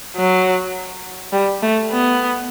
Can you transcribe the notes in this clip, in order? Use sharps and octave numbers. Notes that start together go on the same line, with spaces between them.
F#3
G3
A3
B3